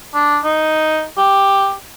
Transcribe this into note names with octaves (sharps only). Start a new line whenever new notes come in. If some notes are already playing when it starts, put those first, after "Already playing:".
D4
D#4
G4